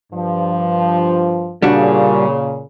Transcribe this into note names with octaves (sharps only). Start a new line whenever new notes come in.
G2 F3
A#2 C#3 G3 D4 F#4